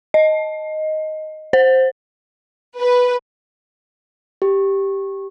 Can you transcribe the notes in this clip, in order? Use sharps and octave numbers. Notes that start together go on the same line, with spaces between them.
D#5
C5
B4
G4